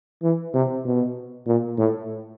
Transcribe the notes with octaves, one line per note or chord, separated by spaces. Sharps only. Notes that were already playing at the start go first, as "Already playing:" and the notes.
E3
C3
B2
A#2
A2